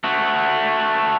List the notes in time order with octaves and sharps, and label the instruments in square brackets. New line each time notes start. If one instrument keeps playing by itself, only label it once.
[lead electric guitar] A3 F#4